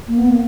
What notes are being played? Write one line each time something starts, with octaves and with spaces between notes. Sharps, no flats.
A#3
B3
A#3